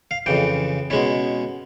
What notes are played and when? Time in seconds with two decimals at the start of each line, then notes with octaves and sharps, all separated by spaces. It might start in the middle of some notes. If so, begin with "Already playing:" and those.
0.11 F5
0.26 F2 C#3 E3 G5
0.90 B2 G#3 C#4 E4